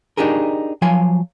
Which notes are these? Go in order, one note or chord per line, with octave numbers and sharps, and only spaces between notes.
D4 D#4 G4 G#4 A#4
F3 F#3 F5 G#5